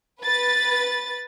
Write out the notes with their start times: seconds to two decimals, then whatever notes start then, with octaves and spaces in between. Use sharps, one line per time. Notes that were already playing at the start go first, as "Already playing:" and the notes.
0.21 B4 A6